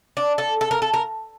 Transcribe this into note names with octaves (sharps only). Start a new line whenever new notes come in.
D4
A4
A4
A#4
A4
A#4